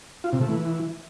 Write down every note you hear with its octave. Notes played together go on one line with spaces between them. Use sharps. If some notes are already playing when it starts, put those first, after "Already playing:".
F4
C3
A3
E3